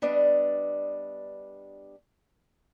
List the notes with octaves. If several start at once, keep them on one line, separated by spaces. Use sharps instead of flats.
G3 B3 D4 D5 D#5